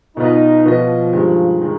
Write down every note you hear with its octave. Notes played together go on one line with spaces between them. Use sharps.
B2 B3 D#4 F4 B4 D#5
B2 F3 B3 F4 B4 D#5
G2 D#3 G#3
D#3 G#3